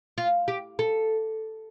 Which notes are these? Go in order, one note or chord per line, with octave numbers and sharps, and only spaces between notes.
F4
G4
A4